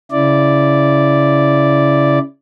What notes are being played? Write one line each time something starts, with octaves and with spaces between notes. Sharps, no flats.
C#3 E4 D5